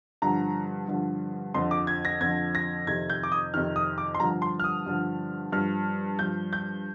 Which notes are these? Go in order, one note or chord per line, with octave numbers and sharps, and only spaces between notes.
G2 D3 F3 A#5
G2 D3 F3
F2 D3 F3 C6
D6
G#6
A#6
F2 D3 F3 G#6
A#6
F2 C3 D#3 G#6
G6
D6
D#6
F2 C3 D#3 F6
D#6
D6
C6
G2 D3 F3 A#5
C6
F6
D#6
G2 D3 F3
G2 F3 F6
G2 F3 G6
G6